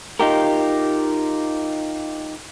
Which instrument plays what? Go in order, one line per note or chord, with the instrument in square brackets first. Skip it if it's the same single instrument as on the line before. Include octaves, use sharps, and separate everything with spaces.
[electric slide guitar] D#4 F4 G4 A#4